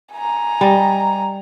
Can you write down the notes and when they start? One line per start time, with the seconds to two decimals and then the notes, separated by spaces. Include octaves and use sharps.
0.13 G#5 A#5
0.61 G3 D#5